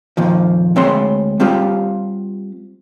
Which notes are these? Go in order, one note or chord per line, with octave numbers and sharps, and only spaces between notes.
F2 A#2 D#3 F3
D2 G#3 C4 C#5 B5 C6
G3 C4 F4 G4 F5